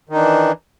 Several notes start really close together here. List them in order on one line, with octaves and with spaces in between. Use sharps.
D#3 D#4 D4 E3